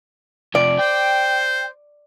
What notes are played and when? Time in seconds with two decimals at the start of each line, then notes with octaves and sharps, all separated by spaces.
0.55 C3 F3 D5
0.79 C5 G5